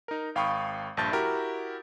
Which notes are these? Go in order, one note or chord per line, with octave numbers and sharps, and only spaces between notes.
D#4 A#4
G#1 F5 G5 B5 C#6 D#6
A#1 G2 A5 G6 A6
E4 F#4 G4 A#4